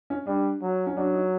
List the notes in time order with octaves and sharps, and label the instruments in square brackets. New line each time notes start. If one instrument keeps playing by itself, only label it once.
[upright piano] C#4
[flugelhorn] G3 [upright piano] D4
[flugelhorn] F#3
[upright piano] C#4
[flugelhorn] F#3 [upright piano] D4
[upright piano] D#4